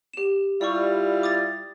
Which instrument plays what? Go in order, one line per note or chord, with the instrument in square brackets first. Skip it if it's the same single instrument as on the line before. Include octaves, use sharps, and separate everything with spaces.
[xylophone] G4 E7
[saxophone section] G3 E4 F4 [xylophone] D5 C#6
[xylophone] D6 D#6 A6